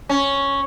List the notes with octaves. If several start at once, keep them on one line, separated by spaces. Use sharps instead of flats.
C#4